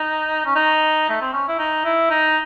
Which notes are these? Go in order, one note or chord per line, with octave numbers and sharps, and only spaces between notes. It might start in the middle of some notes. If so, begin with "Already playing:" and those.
Already playing: D#4
C#4
D#4
A3
C4
C#4
E4
D#4
E4
D#4